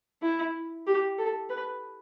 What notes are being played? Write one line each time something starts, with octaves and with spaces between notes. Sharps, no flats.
E4
G4
A4
B4